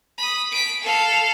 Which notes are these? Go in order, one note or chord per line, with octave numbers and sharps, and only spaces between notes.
B5 D#6
B6 D7
A4 F5